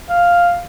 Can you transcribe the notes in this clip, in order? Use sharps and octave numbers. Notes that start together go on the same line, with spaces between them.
F5